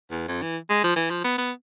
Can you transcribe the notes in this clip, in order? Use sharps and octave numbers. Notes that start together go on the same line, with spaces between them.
E2
F2
E3
G#3
F3
E3
F3
B3
B3